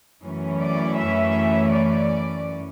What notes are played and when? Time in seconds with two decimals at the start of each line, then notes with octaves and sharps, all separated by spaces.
0.23 F#2 E3 A3 C#4
0.61 D5
0.98 E5
1.72 D5